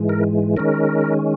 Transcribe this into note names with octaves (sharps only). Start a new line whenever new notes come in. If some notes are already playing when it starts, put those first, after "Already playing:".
Already playing: G#2 E3 G#3
A#4
D#3 G#3 C#4 A#4